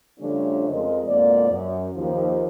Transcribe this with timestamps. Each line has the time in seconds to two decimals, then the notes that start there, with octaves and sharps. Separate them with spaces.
0.19 C#3 F3 G3 A3 C#4 D4
0.69 F2 G#3 A#4 D#5
1.06 F2 G#2 B2 A#3 D5
1.49 F#2
1.94 D#2 F3